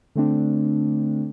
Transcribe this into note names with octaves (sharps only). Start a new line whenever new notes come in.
D3 A3 C4 D4